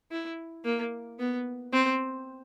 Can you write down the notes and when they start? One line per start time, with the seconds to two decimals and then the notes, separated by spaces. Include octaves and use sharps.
0.11 E4
0.65 A#3
1.19 B3
1.73 C4